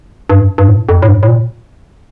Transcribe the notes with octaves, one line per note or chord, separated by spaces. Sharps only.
G2
G2
A2
F2
A2
G2
A2
A#2